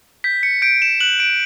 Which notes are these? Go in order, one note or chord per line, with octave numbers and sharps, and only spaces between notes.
G6 B6
C#7
G6 D7
E7
F#6 F#7
D7